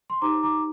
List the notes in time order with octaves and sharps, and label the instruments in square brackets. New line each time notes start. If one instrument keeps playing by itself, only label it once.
[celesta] C6
D#4 G4 C5 A#5 D6
A#5 D6